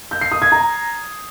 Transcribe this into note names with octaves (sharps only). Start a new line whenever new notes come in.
G6
C7
D#6
G#6
A#5